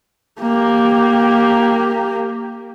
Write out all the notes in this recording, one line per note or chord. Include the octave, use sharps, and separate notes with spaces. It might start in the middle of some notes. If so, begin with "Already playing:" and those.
A#3 G4